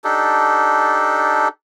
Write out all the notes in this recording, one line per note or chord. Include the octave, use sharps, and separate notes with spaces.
D4 D#4 G4 A4